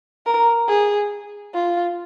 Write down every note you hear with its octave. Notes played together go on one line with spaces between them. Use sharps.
A#4
G#4
F4